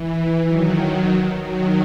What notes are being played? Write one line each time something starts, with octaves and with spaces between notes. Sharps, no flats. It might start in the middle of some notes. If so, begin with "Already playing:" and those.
Already playing: E3
D#3 F#3
D#3 F#3